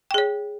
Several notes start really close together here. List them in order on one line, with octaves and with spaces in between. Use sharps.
G5 G#4 C#5